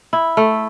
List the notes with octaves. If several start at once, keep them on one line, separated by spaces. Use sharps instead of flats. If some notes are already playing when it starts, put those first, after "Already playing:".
E4
A3